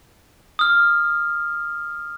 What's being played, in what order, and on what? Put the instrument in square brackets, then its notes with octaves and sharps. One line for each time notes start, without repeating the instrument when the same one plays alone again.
[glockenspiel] D#6 F6